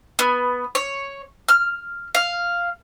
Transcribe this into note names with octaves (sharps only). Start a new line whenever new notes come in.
B3
C#5
F6
F5